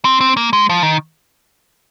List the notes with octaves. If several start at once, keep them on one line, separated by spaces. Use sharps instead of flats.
C4
C4
A#3
G#3
F3
D#3